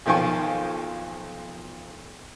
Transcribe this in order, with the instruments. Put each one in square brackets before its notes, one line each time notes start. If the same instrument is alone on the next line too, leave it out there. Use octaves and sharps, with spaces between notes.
[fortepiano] B1 D#3 F3 G5 G#5 C#6